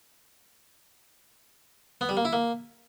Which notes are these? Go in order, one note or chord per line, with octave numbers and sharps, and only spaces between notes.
B3
G3
A#3
E4
A#3